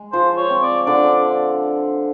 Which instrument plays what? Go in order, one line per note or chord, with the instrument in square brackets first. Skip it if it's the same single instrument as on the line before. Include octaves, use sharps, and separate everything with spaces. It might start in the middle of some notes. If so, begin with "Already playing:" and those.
Already playing: [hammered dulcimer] G#3
[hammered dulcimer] F3 [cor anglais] C5
[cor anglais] C#5
[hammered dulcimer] C4
[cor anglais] D5
[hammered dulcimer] D3 [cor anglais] D5